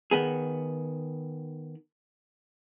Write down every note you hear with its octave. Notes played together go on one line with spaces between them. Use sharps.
D#3 B3 G#4